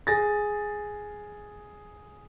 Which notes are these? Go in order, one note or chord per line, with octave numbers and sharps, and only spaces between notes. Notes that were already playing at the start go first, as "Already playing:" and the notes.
G#4 A6 A#6